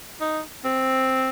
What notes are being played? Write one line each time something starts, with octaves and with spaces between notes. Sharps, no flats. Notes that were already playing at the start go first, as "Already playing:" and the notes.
D#4
C4